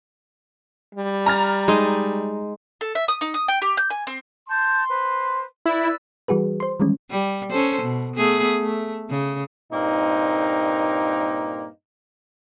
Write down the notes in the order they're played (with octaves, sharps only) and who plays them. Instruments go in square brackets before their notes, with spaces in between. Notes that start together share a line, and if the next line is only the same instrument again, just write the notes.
[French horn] G3
[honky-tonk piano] A#5 F6 A6
[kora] G#3 D#4
[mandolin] A4
E5
D#6
D#4
D#6
G5
G4
G6
G#5
C4
[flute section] A5 G6 [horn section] C6
[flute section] B4 C5
[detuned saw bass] E4 [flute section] B4 D5 E6
[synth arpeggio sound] E3 G3 F#4 G#4 B4
C5 C6
D#3 E3 G3 G#3 C#4
[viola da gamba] G3
C#4 A4 C5
B2
A3 B3 G#4
A3
C#3
[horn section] G2 A#2 A#3 C4 D#4